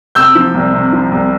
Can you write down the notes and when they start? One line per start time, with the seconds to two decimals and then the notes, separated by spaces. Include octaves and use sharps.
0.15 C3 E6 G6
0.35 F3
0.54 C2
0.73 C3
0.93 F3
1.11 C2